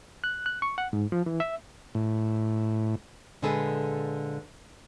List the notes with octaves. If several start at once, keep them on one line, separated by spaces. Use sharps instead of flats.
F#6
F#6
C#6
F#5
G#2
F3
E3
E5
A2
A#2 D3 G#3 G#4 A4 B4